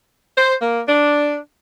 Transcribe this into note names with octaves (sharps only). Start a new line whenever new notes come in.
C5
A#3
D4